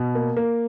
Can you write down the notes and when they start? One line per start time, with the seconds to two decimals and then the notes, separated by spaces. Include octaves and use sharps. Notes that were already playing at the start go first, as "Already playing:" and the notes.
Already playing: B2
0.15 A#3
0.37 A#3